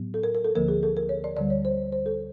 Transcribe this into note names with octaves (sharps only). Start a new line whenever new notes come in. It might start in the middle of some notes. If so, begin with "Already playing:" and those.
Already playing: A2 F#3 B3
A4
A#4
A#4
A4
D2 D3 F3 A#3 A#4
G#4
A4
A#4
C#5
D5
D2 D3 G3 D5
C#5
C5
C5
A4